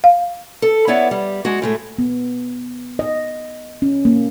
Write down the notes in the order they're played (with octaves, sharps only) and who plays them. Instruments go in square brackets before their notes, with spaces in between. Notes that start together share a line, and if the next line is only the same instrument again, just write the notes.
[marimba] F5
[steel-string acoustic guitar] A4
B3 E4 C#5 D5 E5 F#5
G3
G#3 F#4
A2 G#3 A3
[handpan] B3
D#5
C#4
A#3